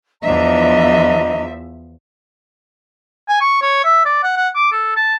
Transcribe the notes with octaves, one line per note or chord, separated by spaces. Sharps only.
E2 F3 D4 D#5 E5 A#5
G#5
C#6
C#5
E5
D5
F#5
F#5
D6
A4
A5